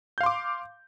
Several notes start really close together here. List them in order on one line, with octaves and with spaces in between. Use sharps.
G6 F5 C6 D6